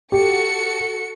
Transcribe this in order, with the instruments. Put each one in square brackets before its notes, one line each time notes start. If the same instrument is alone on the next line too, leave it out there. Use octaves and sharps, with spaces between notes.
[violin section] F#4 A4 C#7 [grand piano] G4